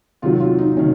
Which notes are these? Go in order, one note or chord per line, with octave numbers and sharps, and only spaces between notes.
C3 D#3 F#3 F4
F4
D#4
C3 D#3 C#4